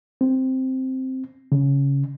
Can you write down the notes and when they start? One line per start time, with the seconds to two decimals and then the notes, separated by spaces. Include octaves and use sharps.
0.21 C4
1.52 C#3